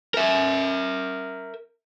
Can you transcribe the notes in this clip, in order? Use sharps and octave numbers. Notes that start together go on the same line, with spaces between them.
A#4 E5